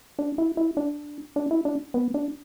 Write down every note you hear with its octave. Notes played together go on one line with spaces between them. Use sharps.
D4
E4
E4
D4
D4
E4
D4
B3
D4